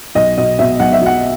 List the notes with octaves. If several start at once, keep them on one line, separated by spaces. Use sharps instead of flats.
B1 D#5
B2 D#5
B2 E5
B1 F#5
E5
F#3 F#5